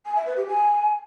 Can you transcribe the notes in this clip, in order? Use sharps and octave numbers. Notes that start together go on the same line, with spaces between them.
G#5
E5
B4
G4
G#5